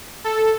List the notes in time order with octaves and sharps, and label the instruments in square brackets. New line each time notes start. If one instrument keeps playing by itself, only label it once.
[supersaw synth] A4